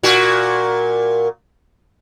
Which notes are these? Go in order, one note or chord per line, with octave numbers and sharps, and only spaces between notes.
A#2 F#4